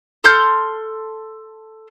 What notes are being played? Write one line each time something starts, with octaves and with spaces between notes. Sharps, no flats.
A4 C6 F6 G6